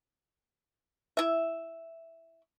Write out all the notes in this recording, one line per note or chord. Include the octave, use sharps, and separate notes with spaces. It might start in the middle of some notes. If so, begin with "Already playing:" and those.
E4 E5